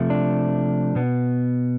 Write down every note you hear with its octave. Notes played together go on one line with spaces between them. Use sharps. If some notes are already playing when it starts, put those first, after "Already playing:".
Already playing: C3 F3 A3
D4
B2 B3